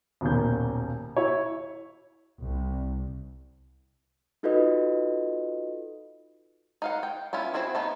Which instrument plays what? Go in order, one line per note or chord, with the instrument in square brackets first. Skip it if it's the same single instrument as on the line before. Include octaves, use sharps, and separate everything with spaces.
[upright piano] D#1 B1 D#3 A#3 G6
E4 C#5
[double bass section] C2
[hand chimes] D#4 F4 F#4 A4 B4 D#5
[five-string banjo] D#4 F5 F#5
G5
B3 C#4 E4 F4
C4 E4 F#4 G#4
A3 B3 D#4